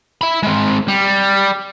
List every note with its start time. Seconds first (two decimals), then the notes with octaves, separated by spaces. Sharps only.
0.21 E5 B5
0.43 G#3 C4
0.88 G3